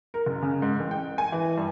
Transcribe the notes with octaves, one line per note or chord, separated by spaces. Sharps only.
A#4
F#1
C#3
G#2
A1
G5
G#5
E3
G2